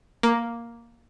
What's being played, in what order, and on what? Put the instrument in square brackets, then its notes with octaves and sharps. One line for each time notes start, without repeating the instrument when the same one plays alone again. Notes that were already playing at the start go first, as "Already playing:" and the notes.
[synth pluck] A#3